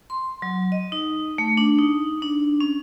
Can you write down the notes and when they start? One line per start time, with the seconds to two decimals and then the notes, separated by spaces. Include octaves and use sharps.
0.10 C6
0.42 F#3
0.72 D#5
0.92 D#4
1.38 A3
1.57 D4
1.79 D#4
2.22 D4
2.61 C#4